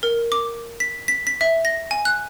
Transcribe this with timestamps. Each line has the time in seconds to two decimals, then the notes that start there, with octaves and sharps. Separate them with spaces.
0.03 A#4
0.32 D6
0.80 B6
1.08 B6
1.27 B6
1.41 E5
1.65 A#6
1.91 G#5
2.05 F#6